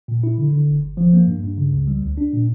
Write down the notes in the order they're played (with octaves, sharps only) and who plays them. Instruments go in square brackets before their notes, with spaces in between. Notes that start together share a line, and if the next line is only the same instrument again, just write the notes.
[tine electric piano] A#2
E4
D3
D3
G1
G1
F3
A#3
G2
G2
C#3
C#2
G3
D2
D4
A#2